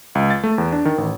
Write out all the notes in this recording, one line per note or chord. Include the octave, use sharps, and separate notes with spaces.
C#2
A6
A3
E2
D4
D#3
A1